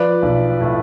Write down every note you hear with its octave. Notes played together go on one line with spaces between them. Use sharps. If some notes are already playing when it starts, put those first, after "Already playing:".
Already playing: F3 B4 D5
B1
A2